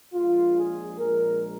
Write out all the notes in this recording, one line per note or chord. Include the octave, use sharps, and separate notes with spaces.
A#1 A#2 G#3 F4
G#4
A#1 A#2 G#3 A#4